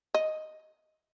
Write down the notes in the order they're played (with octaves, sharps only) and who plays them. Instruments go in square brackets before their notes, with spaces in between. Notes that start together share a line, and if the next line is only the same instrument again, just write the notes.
[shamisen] D#5